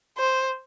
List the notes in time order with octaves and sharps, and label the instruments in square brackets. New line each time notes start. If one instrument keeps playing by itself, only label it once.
[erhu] C5